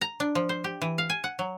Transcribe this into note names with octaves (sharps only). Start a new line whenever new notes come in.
A#5
D4
F3
C5
G4
E3
F5
G#5
F#5
F#3